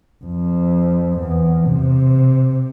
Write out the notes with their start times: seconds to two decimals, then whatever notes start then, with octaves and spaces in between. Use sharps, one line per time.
0.24 F2
1.19 E2
1.66 C3